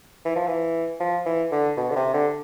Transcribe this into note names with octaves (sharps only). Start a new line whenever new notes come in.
E3
F3
E3
F3
E3
D3
B2
D3
C3
D3